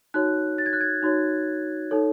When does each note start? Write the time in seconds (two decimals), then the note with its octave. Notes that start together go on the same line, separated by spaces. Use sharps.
0.14 D#4 F#4 C#5 F#6
0.58 A6
0.66 G#6
0.73 F#6
0.81 G#6
1.03 D#4 F#4 C#5
1.91 D#4 A4 C#5